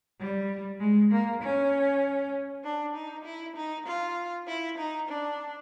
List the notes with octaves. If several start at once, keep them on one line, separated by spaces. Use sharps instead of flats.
G3
G#3
A#3
C#4
D4
D#4
E4
D#4
F4
E4
D#4
D4